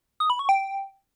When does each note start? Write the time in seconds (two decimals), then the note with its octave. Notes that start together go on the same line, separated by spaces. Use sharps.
0.20 D#6
0.30 B5
0.39 C#6
0.49 G5